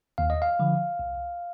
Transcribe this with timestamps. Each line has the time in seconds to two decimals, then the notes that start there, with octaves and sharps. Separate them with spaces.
0.18 D#2 F5
0.30 D#5
0.42 F5
0.59 D3 F3
0.99 C2